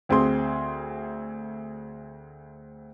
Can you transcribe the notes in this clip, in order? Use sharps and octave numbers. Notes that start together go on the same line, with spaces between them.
D2 C4 G#4 C6